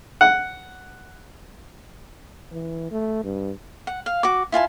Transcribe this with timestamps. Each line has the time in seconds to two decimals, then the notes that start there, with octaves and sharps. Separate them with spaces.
0.21 F#5
2.52 E3
2.92 A3
3.23 G2
3.87 F#5
4.06 F5
4.23 F#4 D6
4.52 E4 F4 G#5 A5